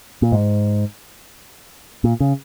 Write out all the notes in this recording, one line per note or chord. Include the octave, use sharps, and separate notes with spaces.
A#2
G#2
A#2
C#3